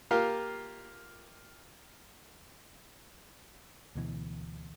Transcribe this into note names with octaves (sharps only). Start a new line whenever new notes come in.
A#3 F4 G4 A#4 F5
D2 B2 E3